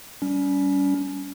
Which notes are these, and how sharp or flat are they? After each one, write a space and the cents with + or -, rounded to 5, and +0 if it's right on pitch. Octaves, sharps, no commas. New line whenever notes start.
G3 -10 C#4 +30